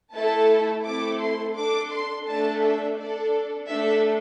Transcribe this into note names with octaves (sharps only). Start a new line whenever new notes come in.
A3 E4 A4 A5
A3 C4 E4 A4 D6
C6
D4 A4 D6
C6
A3 D4 A4 A5
E5
D4 A4 D5
A3 D4 A4 E5